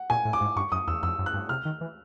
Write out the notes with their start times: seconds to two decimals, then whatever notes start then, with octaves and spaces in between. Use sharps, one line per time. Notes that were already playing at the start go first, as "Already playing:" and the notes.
Already playing: F#5
0.10 A#2 G#5
0.25 A2
0.33 D6
0.41 G#2
0.56 G2 C#6
0.72 F#2 D#6
0.87 E2 E6
1.03 F2 E6
1.19 F#2
1.26 F#6
1.33 G2
1.49 C3 F6
1.65 D#3
1.81 E3